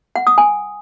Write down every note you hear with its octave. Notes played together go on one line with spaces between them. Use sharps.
F#5
D#6
G#5